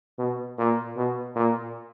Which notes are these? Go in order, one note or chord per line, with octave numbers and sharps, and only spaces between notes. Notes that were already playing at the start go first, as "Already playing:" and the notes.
B2
A#2
B2
A#2